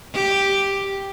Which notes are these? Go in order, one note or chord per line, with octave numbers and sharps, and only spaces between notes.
G4